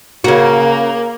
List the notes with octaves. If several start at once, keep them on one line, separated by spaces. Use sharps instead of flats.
C#3 A#3 F#4